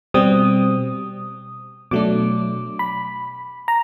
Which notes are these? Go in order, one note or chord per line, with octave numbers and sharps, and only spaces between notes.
B2 G3 C4 D#6
B2 F#3 A3 D4 D6
B5
A#5